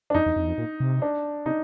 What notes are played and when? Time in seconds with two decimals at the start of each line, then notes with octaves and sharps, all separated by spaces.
0.10 D4
0.14 F2 D#4
0.26 E2
0.36 F2
0.43 E2
0.48 F2
0.58 A#2
0.80 C3
1.02 D4
1.46 C3 D#4